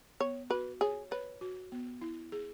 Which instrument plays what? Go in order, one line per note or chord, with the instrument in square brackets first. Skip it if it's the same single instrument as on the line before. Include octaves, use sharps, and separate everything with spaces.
[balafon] B3 [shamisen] C#5
[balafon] F#4 [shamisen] B4
[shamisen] G#4 [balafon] C#5
[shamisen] B4 [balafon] C#5
[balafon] F#4
B3
E4
G#4